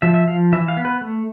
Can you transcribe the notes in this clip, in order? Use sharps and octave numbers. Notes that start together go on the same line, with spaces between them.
F3 E5
E5
F3 F5
E3 E5
F5
B3
B4
A3